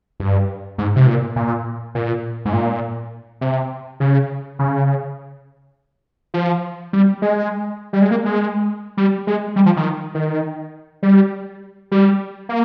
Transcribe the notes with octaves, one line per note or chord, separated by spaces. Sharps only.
G2
G#2
C3
A#2
A#2
A#2
G#2
A#2
C3
C#3
C#3
F3
G3
G#3
G3
G#3
A#3
G#3
G3
G#3
G3
F3
D#3
D#3
G3
G3
A#3